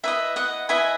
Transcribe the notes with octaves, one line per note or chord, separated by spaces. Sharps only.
E4 B4 D#5 E5
D#5 F#5
E4 B4 D#5 E5 G#5